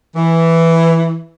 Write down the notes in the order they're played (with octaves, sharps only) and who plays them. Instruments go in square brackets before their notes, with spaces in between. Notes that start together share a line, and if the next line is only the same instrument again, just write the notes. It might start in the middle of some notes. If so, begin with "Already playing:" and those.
[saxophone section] E3